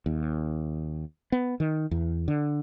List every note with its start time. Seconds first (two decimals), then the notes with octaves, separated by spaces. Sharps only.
0.06 D#2
1.32 B3
1.60 D#3
1.91 E2
2.28 D3